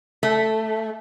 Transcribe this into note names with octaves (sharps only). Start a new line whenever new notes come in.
A3 A4